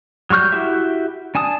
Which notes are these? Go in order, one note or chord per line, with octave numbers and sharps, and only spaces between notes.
F#3 G3 C#6 F6 G6
E4 F#4 G4 E5
D4 G#5 A5 D#6